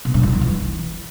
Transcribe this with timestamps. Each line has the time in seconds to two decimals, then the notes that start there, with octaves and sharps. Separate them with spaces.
0.05 B2
0.14 G2
0.23 E3
0.32 D#3
0.41 E3